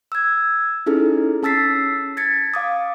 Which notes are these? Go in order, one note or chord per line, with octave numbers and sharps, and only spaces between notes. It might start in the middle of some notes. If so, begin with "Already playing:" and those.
E6 G#6
C#4 D#4 E4 G#4 A4
C#4 A5 E6 A6 B6 C7
G#6 A6 B6 C#7
F5 D6 D#6